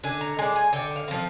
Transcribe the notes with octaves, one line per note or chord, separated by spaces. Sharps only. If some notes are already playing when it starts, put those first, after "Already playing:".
D3 G#5
A#5
G#3 D4 G#5
G#5
D3 G5
F5
F3 C4